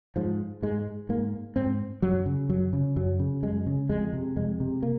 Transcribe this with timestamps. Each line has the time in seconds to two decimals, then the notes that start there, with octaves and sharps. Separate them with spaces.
0.16 G#2 F3
0.62 G#2 G#3
1.09 G#2 A#3
1.56 G#2 C4
2.02 F#2 F#3
2.26 C#3
2.49 F#2 F#3
2.73 C#3
2.96 F#2 F#3
3.19 C#3
3.43 F#2 G#3
3.66 C#3
3.89 F2 G#3
4.13 C3
4.36 F2 G#3
4.60 C3
4.83 A#3